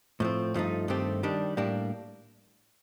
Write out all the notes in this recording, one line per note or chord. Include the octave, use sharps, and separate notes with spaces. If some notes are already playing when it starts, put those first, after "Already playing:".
A2 F3 C4
G2 F3 A3 D#4
G2 D#3 A3 C4 G4
D#3 G3 D4
A2 G3 A#3 D4